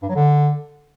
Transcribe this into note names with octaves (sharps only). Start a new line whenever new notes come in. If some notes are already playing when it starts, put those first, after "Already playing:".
G2
F#3
D3